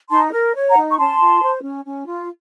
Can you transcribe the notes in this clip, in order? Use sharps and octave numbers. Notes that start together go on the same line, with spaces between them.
D#4 A5 C6
A#4
C#5
F#5 A#5
D#4
C#6
C#4 A5 C6
F4
C5
C#4
C#4
F4